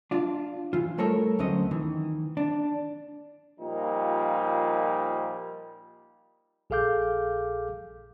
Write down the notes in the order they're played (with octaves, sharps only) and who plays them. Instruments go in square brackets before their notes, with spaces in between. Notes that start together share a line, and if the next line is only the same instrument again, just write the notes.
[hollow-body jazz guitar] D4 F4
E3 F4
G3 A3 A4 A#4 C#5
D2 F#3 C4 C#4 D#5
D#3 E3
D4
[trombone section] A#2 F3 G3 D#4
[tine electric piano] A#1 G#4 A4 F5 D6 G6